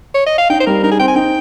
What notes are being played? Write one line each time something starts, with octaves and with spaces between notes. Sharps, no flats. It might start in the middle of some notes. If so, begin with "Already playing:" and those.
C#5
D#5
F5
D#4 G5
C5
G3 A#4
D#4 A#4
G#4
C4 G5
G#5
D#4 G5